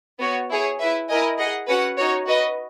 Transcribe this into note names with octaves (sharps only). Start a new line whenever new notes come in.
B3 F#4 C#5
E4 G#4 C#5
E4 B4 E5
E4 A#4 D#5 G#5
G#4 D#5 F#5
C#4 F#4 B4 F#5
D#4 F#4 C#5
F#4 B4 D#5